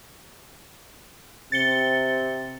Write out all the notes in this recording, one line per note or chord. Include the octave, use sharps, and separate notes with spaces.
C3 C4 A6 C#7 G7